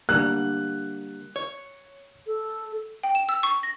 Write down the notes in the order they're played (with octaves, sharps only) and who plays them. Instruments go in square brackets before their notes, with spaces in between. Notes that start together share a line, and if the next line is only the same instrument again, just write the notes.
[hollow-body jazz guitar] D3 G3 A#3 [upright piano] F#6
[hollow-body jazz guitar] C#5
[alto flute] A4
[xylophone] G5
E7
E6
C#6
A#6